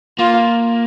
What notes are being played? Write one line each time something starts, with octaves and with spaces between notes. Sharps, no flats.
A#3 F4